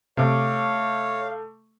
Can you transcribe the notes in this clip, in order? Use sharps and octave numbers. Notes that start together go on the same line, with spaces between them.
C3 A3 C#5 F5 D6